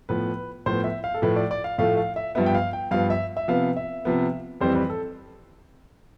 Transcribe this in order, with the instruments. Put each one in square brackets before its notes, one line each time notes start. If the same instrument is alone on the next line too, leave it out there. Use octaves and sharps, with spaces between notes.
[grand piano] A2 F3 B3 B4
A2 F3 B3 C5
E5
F5
A4
A2 F3 A3 B4
D5
D5
F5
A2 F3 A3 F5
F5
E5
G2 F3 B3 E5
G5
F5
G5
G2 F3 B3 F5
E5
E5
C3 F3 B3 F5
E5
C3 F3 B3
F2 E3 G3 C4 C5
B4
A4